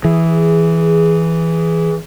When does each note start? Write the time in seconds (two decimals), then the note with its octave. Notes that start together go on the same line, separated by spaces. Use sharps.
0.04 E3 G#4